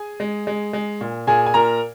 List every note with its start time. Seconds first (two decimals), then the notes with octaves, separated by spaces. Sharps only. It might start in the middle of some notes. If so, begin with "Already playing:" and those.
Already playing: G#4 G#5
0.20 G#3
0.47 G#3
0.73 G#3
1.01 A#2
1.27 A#2 G#4 G#5
1.46 G#5
1.54 A#2 A#4 A#5